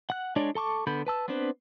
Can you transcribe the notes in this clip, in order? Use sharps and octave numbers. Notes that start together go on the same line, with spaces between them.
F#5 F#6
G#3 D4 C#5 D5
A4 A5 C#6 D6
D3 B3 A4 B5 G6
B4 A5 E6
B3 C4 D4 B4 C5